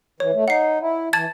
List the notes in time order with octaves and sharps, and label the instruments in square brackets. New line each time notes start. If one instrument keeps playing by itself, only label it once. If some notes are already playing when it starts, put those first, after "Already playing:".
[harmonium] E3 [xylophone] C#5
[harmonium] A3
[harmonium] D#4 [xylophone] F#5 C7
[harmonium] E4
[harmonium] E3 [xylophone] A5 G#6 A6